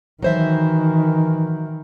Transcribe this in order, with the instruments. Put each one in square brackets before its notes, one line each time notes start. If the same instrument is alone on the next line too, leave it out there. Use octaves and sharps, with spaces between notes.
[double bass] D#3 [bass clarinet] E3 [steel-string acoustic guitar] F#3 C5 E5